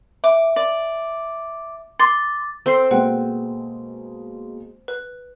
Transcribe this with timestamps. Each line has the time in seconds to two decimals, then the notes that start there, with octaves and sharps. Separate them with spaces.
0.24 E5 D6
0.56 D5
1.99 C6 D6 A6
2.66 C4 A4 C6 C7
2.91 B2 G#3 A#3 B4 F#5 G5
4.88 B4